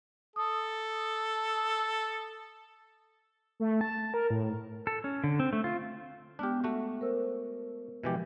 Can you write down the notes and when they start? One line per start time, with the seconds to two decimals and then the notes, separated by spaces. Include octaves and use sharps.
0.36 A4 D#6
3.60 A3
3.81 A5
4.14 A#4
4.30 A2
4.87 A4
5.04 C#4
5.24 D3
5.40 C4
5.53 A3
5.64 F4
6.39 G#3 B3 D4 G4 F6
6.64 A3 F#4
7.01 A#4 C5 E6
8.03 B2 E3 F3 G#3 G4